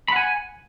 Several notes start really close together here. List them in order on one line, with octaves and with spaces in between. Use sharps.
B5 F#5 G#5